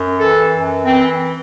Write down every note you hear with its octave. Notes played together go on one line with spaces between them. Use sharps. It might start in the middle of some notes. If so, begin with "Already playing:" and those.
Already playing: F#2
E3 A4
F#2
E3 C4